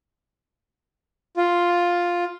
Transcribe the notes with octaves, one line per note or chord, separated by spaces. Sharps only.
F4